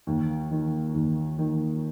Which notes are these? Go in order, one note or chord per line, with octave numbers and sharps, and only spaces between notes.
D#2
D#3
D#2
D#3